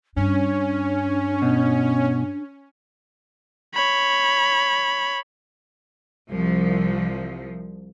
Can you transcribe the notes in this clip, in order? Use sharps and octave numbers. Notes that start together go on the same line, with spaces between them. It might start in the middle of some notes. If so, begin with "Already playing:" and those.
G2 C#4 D4
B2
C#5 B5
C2 F3